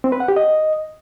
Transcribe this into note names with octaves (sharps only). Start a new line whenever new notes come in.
C4
B4
F#5
G4
D#5